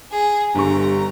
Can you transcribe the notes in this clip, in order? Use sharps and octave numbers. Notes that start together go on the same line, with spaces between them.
G#4
G1 G2 D3 A#5 C#6